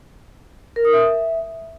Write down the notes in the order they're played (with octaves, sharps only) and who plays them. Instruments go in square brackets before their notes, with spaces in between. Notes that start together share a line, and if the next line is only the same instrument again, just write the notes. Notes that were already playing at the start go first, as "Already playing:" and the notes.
[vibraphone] A#4
D#6
E5